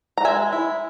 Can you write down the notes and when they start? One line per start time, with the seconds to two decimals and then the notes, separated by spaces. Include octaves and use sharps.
0.17 A#5
0.25 G#3 E5 G#5
0.52 E4